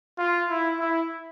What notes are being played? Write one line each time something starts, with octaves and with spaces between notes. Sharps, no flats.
F4
E4
E4